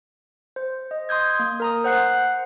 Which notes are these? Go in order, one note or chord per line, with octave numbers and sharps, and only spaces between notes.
C5
D#5
C6 D#6 G6 G#6
A#3
A#4 A#5 D#6
C5 F#5 F#6 C7